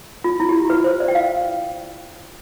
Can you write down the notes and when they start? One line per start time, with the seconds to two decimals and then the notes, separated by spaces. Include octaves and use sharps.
0.24 F4
0.40 E4
0.49 G4
0.55 F4
0.70 B4
0.84 C5
1.00 D5
1.08 G5
1.15 F5